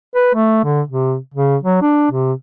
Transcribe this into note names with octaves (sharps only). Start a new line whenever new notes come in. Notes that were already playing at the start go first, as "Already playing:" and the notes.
B4
A3
D3
C3
C#3
F#3
D4
C3